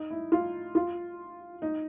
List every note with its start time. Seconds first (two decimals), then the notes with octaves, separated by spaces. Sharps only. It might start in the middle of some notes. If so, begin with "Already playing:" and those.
Already playing: D#4
0.10 E4
0.32 F4
0.75 F4
1.62 D#4